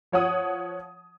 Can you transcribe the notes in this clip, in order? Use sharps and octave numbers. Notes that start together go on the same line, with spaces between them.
F3 C#5 F#5 D#6